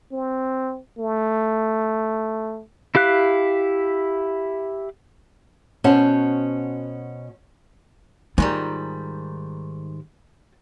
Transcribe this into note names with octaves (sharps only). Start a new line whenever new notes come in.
C4
A3
E4 G4 F5 F#6
B2 C#4 F#4 C5 F#5 A5
G#2 D#3 G3 F4